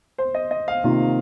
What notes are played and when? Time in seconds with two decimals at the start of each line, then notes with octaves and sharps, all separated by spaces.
0.18 C5
0.35 D#5
0.51 D#5
0.68 F5
0.84 C3 D#3 A#3 F4